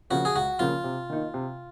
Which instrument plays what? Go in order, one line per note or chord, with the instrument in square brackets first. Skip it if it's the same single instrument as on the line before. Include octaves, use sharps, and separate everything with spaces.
[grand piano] C#3 F3 A#3 [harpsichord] F#4
[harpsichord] G#4
[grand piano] C#2 [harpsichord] F#4
[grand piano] C#3 F3 A#3 [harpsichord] F4
[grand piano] C3
D#3 A#3 D#4
C3